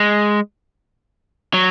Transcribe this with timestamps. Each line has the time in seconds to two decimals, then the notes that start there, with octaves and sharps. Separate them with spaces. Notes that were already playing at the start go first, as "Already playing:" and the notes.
Already playing: G#3
1.54 F#3